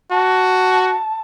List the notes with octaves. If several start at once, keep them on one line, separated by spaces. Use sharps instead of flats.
F#4 A5